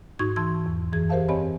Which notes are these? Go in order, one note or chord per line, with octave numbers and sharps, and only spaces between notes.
G#2 D#4 F#4 C#6 G#6
E3 A5 C6 E6 G#6
E2
F#2 E3 G#4 G#6
G4 A#4 C5 E5 F5 A5
C4 G4 C#5 D#5 G#5 B5